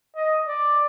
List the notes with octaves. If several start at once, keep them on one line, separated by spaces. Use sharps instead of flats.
D#5
D5